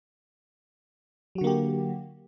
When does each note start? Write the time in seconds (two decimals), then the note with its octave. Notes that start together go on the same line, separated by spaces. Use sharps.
1.35 F#3
1.38 F#4
1.41 D3
1.44 A#3
1.47 G4